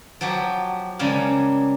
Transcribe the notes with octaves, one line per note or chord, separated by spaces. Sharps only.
F3 F#3 F#4 G4 F#5
C#3 F3 G3 G#3 A#3